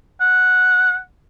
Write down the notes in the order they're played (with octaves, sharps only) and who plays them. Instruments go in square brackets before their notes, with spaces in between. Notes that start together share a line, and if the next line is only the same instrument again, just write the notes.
[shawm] F#5